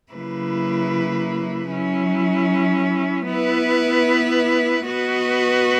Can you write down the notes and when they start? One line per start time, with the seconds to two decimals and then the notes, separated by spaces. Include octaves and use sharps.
0.13 C#3 F#3 A#3 E4 B4
1.71 F#3 C#4 E4
3.28 B3 E4 B4
4.87 B3 F#4 B4 D#5